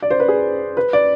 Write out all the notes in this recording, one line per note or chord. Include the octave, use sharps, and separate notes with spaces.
D5
C5
B4
G#4
B4
D5